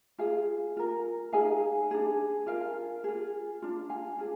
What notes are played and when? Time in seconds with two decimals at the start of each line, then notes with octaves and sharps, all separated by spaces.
0.18 F4 G#4 F5 G#5
0.77 F4 A#4
1.33 D#4 G#4 F5 G#5
1.91 D4 G#4
2.47 F4 A#4 F5 G#5
3.04 F4 G#4
3.62 D4 F4
3.89 F5 G#5
4.18 D4 F4 G#4